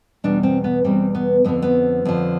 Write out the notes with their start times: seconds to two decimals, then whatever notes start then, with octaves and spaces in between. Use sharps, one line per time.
0.24 E2 B2 G3 D4
0.43 C4
0.64 B3
0.85 E2 B2 G3 C4
1.15 B3
1.45 F2 D3 F3 B3
1.62 B3
2.05 F2 D3 F3